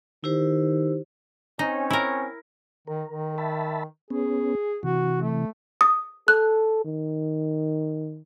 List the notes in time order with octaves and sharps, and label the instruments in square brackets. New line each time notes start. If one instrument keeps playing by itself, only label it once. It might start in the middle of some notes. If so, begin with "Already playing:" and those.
[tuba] D#3 [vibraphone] E4 G4 C5
[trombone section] C4 C#4 [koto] D#4
[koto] E4 A#4
[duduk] D#3 [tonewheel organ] A#4
[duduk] D#3
[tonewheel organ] E5 A5 B5
[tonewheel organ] B3 C#4 [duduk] G#4
[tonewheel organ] C3 E3 [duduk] F#4
[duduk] A3
[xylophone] D#6
[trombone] A4 [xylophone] F#6
[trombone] D#3